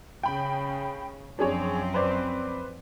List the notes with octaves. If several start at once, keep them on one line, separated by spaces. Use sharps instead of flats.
C#3 G5 B5
F#2 F3 C4 D4 G#4 C#5
B4 C5 D5